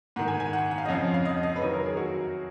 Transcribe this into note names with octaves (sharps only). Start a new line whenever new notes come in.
G#2 D#3 F#5
G#5
G#5
F#5
F#5
F5
D#5
F2 C#3 F3 F5
F5
D#5
D#5
B4
F#2 D#3 C#5
A#4
G#4
F#4